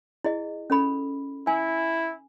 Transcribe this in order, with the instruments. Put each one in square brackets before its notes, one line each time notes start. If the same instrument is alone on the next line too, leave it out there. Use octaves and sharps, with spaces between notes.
[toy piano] E4 G#4 D#5
C#4 A4 B5
[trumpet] E4 [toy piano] G#5